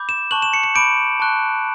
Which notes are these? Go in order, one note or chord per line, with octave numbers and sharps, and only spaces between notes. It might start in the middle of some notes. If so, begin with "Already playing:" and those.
Already playing: B5 D6 G6
E7
A5 C#6 F#6 F#7
E7
C#7
C#7
B5 D6 G6 D7
A5 C#6 F#6